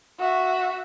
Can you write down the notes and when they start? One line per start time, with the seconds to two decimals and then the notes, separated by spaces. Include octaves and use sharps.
0.19 F#4 E5